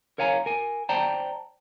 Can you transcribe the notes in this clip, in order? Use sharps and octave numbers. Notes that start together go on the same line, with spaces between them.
A#4 C#5 F5 G#5 A#5
A#4 G#5
C5 D5 G5 A5 A#5